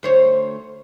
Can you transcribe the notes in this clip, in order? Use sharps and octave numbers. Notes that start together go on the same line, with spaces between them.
D2 C5 C#5